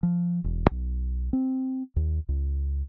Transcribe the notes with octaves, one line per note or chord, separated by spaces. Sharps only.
F3
E1
B1
C4
D#2
C#2